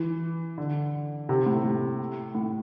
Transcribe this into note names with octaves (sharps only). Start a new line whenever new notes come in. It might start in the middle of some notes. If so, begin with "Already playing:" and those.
Already playing: E3
D3
C3
A2
A2
A2